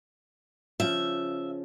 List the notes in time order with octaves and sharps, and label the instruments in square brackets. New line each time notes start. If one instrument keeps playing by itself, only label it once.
[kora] C#3 F3 [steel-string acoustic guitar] E5